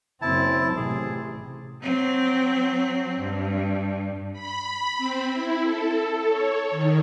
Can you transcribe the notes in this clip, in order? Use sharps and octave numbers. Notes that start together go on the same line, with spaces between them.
F#1 C4 E4 A5
A1 C3 G#4
F#3 C4
G2
B5
C4
E4
A4
C#5
D#3